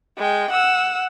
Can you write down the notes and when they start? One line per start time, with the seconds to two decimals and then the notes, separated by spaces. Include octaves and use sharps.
0.18 G#3 G5
0.50 F#5 E6